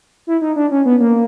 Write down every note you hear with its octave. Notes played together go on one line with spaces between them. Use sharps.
E4
D#4
D4
C#4
B3
A#3